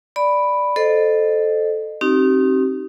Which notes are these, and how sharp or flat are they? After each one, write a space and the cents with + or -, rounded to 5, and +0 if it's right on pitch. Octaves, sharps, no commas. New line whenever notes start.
D5 +0 B5 +0
A4 +0 C5 +0 D#5 -30
C4 +30 D#4 +0 G4 -40